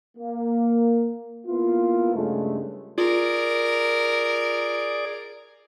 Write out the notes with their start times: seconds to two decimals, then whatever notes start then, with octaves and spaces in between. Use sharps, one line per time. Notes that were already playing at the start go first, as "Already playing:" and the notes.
0.17 A#3
1.47 A#3 B3 E4 F4
2.15 G2 C#3 G#3 A3
2.98 F4 G#4 A#4 D5